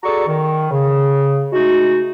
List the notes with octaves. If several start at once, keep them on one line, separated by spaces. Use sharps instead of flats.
F#4 G#4 A4 D5 A#5 C#6
D#3
C#3
G#3 A3 D#4 F#4